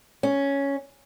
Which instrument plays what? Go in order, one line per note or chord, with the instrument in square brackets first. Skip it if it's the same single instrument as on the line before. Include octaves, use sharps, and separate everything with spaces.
[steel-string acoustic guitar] C#4